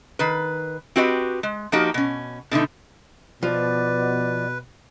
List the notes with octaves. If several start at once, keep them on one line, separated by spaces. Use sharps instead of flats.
D#3 B4
C4 F#4 G4 B4 D#5
G#3
F3 A#3 D#4 F#4 G4
B2 C#4
B2 D3 A3 D#4
B2 F3 B4 D5